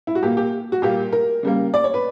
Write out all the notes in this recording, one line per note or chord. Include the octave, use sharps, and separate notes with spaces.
E4
F#4
A#2 A#3 G4
G4
F#4
A#2 G3 A#3 G4
A#4
C#3 G3 A#3
D5
C#5
B4